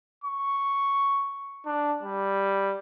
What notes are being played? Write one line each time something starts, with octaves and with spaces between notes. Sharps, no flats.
C#6
D4
G3